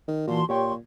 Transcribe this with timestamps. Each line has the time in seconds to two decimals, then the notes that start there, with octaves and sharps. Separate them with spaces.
0.08 D#3
0.27 A#2 E3 F#4 A5 C6
0.49 A#2 G4 C#5 G5 C6 C#6